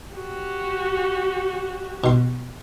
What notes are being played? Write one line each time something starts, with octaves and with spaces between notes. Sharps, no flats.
F#4 G4
B2 C6